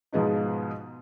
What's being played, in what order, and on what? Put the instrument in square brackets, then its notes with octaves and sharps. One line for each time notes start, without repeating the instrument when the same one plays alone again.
[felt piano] G#2 B2 F3 G#3 B3 D#4